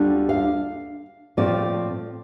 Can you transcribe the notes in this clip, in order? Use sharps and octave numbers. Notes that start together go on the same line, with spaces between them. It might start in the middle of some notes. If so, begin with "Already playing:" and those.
Already playing: D2 D3 G3 D4 F4
F5
A2 F3 C4 F4 D5